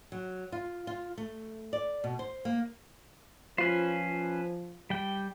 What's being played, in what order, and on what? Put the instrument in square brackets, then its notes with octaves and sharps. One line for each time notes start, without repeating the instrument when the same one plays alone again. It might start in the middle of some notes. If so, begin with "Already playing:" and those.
[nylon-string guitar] F#3
F4
F4
A3
D5
B2
C5
A#3
[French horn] F3 [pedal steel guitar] C#4 B4 C5 [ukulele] F4
[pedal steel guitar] G3 G5